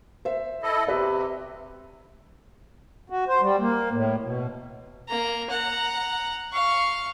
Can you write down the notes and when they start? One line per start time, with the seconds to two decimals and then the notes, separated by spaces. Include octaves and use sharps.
0.25 C5 E5
0.63 E4 A4 D#5
0.87 C3 G4 B4 E5
3.10 F#4
3.28 C5
3.41 G3
3.59 A#3
3.92 A2
4.23 B2
5.08 A#3 A#5
5.50 F#5 A#5
6.52 F5 C#6